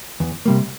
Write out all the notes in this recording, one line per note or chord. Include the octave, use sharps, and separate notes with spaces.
E2
C3 G3 A#3